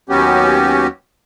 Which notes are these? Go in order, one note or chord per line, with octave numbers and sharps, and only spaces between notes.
D#2 F#3 B3 C#4 F#4 G4